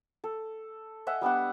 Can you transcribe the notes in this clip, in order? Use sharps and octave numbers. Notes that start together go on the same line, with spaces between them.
A4
D#5 E5 F#5 G#5
G3 B3 D4 F#5